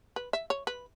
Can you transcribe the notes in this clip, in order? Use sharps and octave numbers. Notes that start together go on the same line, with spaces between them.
B4
E5
C#5
B4